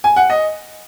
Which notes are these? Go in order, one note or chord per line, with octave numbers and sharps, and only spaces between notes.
G#5
F#5
D#5